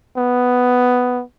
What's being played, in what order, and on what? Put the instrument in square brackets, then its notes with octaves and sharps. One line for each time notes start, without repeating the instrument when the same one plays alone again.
[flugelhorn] B3